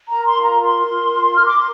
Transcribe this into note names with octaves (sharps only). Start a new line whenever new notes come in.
A#4 A#5
C6
F4
A#5
A#4 C6
F4
F4
F6
A#4
D6
C6